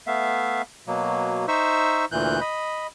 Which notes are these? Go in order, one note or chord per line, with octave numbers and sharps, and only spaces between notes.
A3 B3 E5 F5
B2 F#3 A#3
D#4 C5 E5 C#6 E6
D2 A#2 E3 F#6 G6
D#5 B5